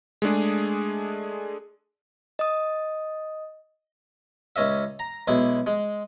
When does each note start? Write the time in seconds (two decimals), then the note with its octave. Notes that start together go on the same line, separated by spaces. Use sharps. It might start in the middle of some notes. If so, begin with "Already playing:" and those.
0.22 G#3 A3 D4 G#4
2.39 D#5 D#6
4.56 C#2 C#4 D#5 E5
4.99 A#5
5.28 B1 G#3 E4
5.67 G#3